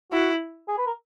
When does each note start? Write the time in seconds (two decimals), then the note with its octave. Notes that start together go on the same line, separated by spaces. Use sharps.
0.12 E4 F#4
0.68 G#4
0.78 B4
0.87 A#4